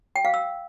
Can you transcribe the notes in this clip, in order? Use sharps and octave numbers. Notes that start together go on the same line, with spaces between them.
G5
F5
E6